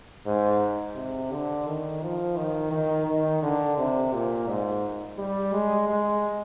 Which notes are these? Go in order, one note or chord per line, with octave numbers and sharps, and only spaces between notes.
G#2
C3
D3
D#3
F3
D#3
D#3
D#3
D3
C3
A#2
G#2
G3
G#3
G#3